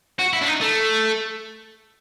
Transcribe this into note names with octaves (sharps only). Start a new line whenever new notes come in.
F#4
E4
D4
D#4
A3